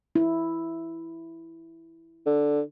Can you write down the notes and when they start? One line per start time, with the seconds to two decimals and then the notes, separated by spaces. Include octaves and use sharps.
0.15 E4
2.26 D3